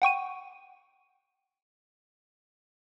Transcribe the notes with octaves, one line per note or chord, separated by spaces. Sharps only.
F#5 G5 C#6 D#7